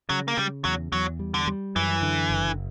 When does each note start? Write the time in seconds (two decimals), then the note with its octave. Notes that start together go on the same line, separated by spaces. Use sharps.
0.09 C#3 F#3
0.28 A#3
0.37 C#3 G3
0.65 E2 F#3
0.92 E2 F#3
1.19 G3
1.34 D3
1.47 G3
1.76 F#2 E3
2.02 D3
2.30 F#1